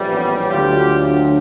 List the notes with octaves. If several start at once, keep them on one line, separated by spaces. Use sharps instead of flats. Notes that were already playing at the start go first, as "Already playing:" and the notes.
Already playing: A#1 A2 E3 G3
B3 C#4
D2 D3 F#3 F4 G4